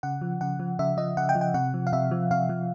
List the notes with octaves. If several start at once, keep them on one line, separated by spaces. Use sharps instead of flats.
C#3 F#5
F3
C#3 F#5
F3
C#3 E5
F3 D#5
C#3 F#5
G5
F3
G5
C3 F#5
F3
F5
C3 E5
F3
C3 F5
F3